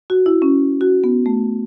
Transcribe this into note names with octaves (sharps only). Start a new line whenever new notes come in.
F#4
E4
C#4
F#4
B3
A3